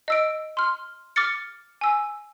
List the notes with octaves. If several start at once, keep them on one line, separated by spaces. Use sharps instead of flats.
D#5 E6 D7
C6 F6
D6 F6 A6 C#7
G#5 E6